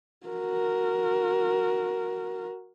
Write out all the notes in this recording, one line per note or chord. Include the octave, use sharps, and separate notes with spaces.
F#4 A#4